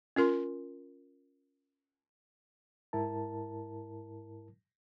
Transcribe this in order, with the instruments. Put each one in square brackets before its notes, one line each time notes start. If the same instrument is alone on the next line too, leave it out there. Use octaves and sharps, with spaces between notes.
[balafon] C#4 F4 A#4 C6
[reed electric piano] G#2 E4 A#4 A5